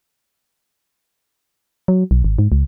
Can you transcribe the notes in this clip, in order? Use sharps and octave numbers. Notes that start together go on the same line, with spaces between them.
F#3
B1
G#1
G#2
C#2